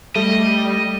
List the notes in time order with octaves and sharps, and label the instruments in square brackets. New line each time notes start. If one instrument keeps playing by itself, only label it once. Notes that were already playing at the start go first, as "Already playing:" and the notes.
[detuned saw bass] G3 [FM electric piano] A3 [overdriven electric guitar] D#5